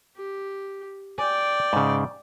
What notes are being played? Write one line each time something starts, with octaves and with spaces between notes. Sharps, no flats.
G4
D5 G5 G#5
G#2 C#3